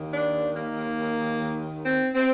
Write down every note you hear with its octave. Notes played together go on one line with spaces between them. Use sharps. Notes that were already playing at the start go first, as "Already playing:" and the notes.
Already playing: D#2 D#3 A#3
D4
A#3
C4
C4